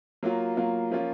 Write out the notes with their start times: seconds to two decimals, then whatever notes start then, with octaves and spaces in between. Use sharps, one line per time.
0.23 F#3 A#3 F4
0.57 F#3 A#3 F4
0.91 F3 A#3 C#4 F4